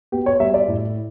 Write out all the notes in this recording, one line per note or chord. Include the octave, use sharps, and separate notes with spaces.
B3 G4
C#5
G3 E5
D5
A2